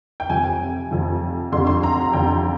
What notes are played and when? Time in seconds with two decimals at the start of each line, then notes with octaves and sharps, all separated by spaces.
0.20 G5
0.29 F2 C3 F3 G#5
0.91 F2 C3 F3
1.52 F2 D3 G3 C6
1.67 C6
1.83 A#5
2.13 F2 D3 G3 G5